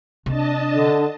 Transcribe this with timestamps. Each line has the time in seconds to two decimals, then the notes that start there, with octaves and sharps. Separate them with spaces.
0.26 C3 D4 D#5 A5
0.74 D3